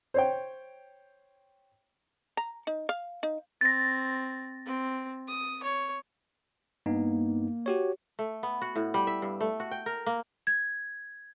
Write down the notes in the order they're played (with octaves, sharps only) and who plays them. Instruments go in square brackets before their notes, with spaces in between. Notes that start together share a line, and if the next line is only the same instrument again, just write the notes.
[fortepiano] C5 C#5 G5
[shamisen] A#5
D#4
F5
D#4
[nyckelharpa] C4 [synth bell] A6 A#6
[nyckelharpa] C4
D#6
C#5
[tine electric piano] G2 B3 D#4 [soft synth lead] A#3
[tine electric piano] F#4 G4 C#5
[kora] A3
B3
F#4
A2
G3
E5
G2
A3
F#4
G5
A#4
A#3
[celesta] G#6